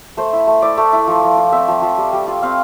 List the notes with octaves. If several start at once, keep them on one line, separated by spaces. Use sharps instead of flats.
A3 C5
E4
A3
E4 D5
A3
E4
F3
F3
F4
C4 E5
F3
F3
G3
G3
F4
C4 F5